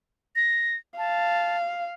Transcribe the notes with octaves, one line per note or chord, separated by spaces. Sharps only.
A#6
F5 A5